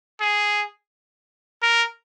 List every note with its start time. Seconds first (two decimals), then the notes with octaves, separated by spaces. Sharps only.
0.21 G#4
1.62 A#4